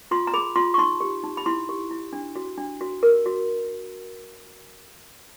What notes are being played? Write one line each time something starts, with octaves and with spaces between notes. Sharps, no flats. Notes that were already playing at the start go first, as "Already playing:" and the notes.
F4 C6
A#5
G#4 B5
F4 C6
C#6
D#4 C6
G4
D#4
B5
E4 C6
G4
E4
D4
F#4
D4
F#4
A#4
F#4